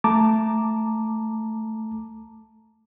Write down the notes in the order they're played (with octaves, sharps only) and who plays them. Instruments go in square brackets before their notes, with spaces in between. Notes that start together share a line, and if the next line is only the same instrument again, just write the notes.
[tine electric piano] A3 A5 A#5 D6